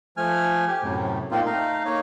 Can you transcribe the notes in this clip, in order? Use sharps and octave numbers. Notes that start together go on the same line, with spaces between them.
F3 A3 G#5 F6
G4
F#2 A2 C3
A#2 A#3 C4 D#4 F4
A3 D#4 F5 A#5
A#3 D#4 C#5